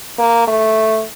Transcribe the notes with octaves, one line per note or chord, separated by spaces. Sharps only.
A#3
A3